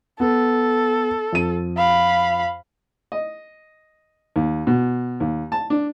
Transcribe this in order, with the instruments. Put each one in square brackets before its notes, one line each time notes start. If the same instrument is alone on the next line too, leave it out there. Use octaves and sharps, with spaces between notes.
[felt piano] B3 [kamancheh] A4
[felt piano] F2 D#7
[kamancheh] F5 B5
[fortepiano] D#5
D#2
B2
D#2
A5
D4